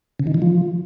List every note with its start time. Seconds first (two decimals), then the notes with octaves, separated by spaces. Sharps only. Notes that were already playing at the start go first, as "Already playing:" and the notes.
0.20 C#3
0.27 D#3
0.34 E3
0.42 F3